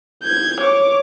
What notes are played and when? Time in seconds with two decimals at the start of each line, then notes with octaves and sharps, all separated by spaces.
0.23 G6 G#6
0.60 C#5 D6